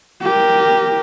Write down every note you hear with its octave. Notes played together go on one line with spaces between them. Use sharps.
G4 A#4